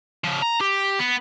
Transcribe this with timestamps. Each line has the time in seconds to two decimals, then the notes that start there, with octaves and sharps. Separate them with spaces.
0.24 C#3 F3
0.42 A#5
0.61 G4
0.99 B3